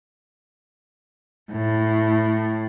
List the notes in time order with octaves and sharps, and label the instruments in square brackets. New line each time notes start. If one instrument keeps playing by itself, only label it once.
[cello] A2